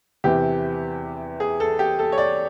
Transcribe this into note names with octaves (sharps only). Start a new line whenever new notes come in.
E2 C3 E3 G4
G#4
A4
G4
A4
C#5
D5